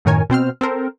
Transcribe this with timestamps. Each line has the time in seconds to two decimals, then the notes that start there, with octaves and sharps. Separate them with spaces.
0.05 F#2 A2 D#3 A#4 C#5 G#5
0.30 B2 C4 C5 F6
0.61 C4 A4 A#4 C5